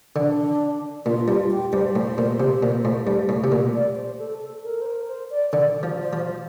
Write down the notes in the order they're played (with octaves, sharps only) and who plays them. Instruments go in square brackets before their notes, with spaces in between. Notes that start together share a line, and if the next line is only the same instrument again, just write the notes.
[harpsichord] D3 [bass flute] D4
[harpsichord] A#2 [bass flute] F4
[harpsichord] G2 [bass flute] F4
[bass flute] G4
[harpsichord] G2 [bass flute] C5
[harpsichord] A2
A#2
C3
A#2
A2
G2
A2
C3
A#2
[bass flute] D5
C5
A4
A4
A#4
C5
A#4
C5
D5
[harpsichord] D3 [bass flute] D5
[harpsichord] F3
[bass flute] C5
[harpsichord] F3